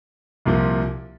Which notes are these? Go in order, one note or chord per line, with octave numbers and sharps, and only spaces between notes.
C2 A#2 F3